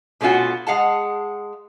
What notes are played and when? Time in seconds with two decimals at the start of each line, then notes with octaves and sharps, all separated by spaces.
0.21 B2 A3 C#4 F4 F#4
0.67 G#3 F5 F#5 A5